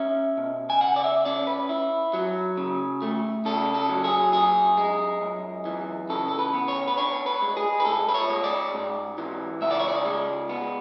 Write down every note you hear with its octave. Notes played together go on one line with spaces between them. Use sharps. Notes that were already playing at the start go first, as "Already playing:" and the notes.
Already playing: C#4 E5
B2
G#5
C#3 F#5
D5
E5
C#4 D5
B4
E4
F#3
C#3
A3
C#3 A4
A4
F#3
G#4
F#2 G#4
G#3
F#2
E3
C#3 A4
A4
B4
B3
C#5
B4
D4 C#5
B4
G#3
G#4
B4
G#2 A4
B4
C#5
G#3
D5
G#2
E3
C#2 E5
D5
C#5
D5
G#3
B3